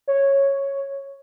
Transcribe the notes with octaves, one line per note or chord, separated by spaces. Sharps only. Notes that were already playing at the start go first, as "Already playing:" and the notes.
C#5